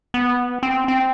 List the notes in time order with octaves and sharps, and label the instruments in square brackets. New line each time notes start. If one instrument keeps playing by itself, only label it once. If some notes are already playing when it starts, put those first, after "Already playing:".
[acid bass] B3
C4
C4